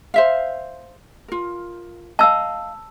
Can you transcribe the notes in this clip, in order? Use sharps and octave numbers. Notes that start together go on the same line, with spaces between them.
C5 E5 F5
F4 A#4
D#5 F5 A5 E6